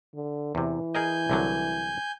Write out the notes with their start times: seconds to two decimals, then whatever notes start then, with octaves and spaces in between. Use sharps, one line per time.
0.15 D3
0.55 E2 C3 E3
0.95 G#4 A#4 D#5 G#5 G6
1.30 C2 D3 F#3